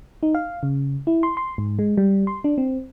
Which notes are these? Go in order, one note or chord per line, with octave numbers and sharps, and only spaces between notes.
D#4
F5
C#3
E4
C6
C6
G#2
G#3
G3
C6
D4
C4